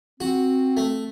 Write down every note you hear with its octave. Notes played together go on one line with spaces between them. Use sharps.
C4 F#4
A3